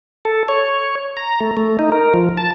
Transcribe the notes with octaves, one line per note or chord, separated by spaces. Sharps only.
A4
C#5
A#5
A3
A3
D#4
A#4
F3
A5